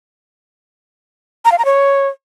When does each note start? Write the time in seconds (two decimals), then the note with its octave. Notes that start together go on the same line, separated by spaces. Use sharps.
1.45 A#5
1.52 F5
1.58 A#5
1.65 C#5